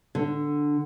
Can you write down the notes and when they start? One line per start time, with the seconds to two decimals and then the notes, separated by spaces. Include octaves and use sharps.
0.15 D3